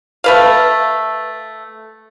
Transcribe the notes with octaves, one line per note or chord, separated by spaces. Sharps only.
A3 B4 F5